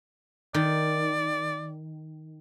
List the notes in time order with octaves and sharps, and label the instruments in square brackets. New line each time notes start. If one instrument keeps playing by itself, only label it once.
[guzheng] D#3 [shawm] D5